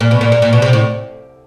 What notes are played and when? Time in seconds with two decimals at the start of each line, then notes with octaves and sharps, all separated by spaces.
0.01 A#2
0.11 B2
0.21 A#2
0.32 A#2
0.42 A#2
0.53 B2
0.62 C3
0.73 A2